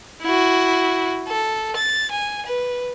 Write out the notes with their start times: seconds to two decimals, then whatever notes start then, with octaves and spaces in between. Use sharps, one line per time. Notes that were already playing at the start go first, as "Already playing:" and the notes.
0.22 E4 F#4
1.28 A4
1.76 A6
2.11 G#5
2.46 B4